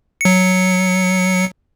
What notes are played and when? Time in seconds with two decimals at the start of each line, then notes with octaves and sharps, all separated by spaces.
0.21 F#3 C#7